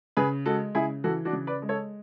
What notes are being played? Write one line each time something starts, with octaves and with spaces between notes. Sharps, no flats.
C#3 G#4 B4
G#3 F#4 A4
C#3 E4 G#4
E3 F#4 A4
D4 F#4
C#3
B4 D5
G#3
A4 C#5